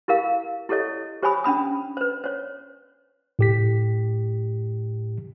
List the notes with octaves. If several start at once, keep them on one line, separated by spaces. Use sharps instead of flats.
E4 G4 A#4 F5
E4 G4 A4 C#5 D#5
G4 C5 C#5 G#5 B5 D#6
C#4 D4 B5 D#6
B4 C5
C5 C#5
A2 G4 B6